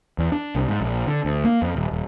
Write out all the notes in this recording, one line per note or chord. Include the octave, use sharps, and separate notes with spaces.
E2
D4
C2
G#2
A#1
D3
D2
A#3
F2
D#1
D#1